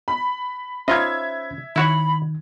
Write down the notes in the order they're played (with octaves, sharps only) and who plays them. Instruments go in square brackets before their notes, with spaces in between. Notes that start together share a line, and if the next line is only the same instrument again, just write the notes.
[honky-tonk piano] B5
[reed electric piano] C#4 C5 B5 [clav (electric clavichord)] D#4 F4 D#5 [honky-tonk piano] E5 G#6
[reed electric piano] D#3 [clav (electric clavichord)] E4 F#4 C#5 [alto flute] B5